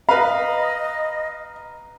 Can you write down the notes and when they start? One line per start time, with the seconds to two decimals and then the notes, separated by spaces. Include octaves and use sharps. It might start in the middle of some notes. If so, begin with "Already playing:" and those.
0.09 B4 D#5 F5 A#5